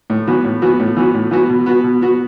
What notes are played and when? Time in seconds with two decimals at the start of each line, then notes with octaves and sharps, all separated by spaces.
0.10 A2
0.27 E3 B3 F#4
0.44 A2
0.62 E3 B3 F#4
0.80 A2
0.97 E3 B3 F#4
1.14 A2
1.31 E3 B3 F#4
1.49 B2
1.66 B3 F#4
1.84 B2
2.01 B3 F#4